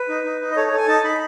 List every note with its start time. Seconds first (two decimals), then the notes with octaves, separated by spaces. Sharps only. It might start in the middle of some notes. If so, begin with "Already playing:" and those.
Already playing: B4
0.09 D#4
0.25 D#4
0.41 D#4
0.51 D#5
0.56 A4 C#5
0.67 C#5
0.73 A4 G#5
0.88 D#4 A5
1.03 D#4 B5